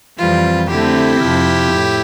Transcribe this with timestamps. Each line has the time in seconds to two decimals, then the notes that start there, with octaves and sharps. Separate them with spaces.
0.18 F2 E3 G3 C4 F4
0.70 D3 A3 C4 E4 G4
1.21 F2 C3 F3
1.73 A2